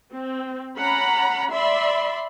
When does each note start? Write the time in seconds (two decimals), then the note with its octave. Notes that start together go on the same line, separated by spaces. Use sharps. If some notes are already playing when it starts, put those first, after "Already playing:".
0.13 C4
0.77 C#4 F#5 A#5 B5
1.53 D5 E5 B5 C6